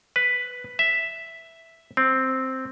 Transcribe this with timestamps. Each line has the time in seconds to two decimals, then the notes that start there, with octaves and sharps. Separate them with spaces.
0.16 B4
0.79 E5
1.97 C4